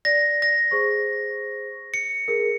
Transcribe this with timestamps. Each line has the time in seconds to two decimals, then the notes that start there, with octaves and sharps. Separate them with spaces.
0.05 D5 A#6
0.42 A#6
0.71 G#4 C5 C#6
1.94 C#7
2.28 G#4 A#4